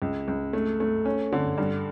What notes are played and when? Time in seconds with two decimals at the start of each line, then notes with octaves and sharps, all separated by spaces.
0.02 C#2
0.28 C#2
0.53 A3
0.80 A3
1.05 C#4
1.32 D3
1.58 G2